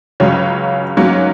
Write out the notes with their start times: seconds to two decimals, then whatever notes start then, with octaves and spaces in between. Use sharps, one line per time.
0.20 C#2 C#3 F#3 C#4
0.97 G#2 F#3 A#3 C#4